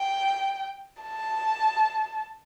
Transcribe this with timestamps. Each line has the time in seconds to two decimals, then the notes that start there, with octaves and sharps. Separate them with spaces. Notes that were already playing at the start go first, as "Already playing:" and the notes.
Already playing: G5
1.02 A5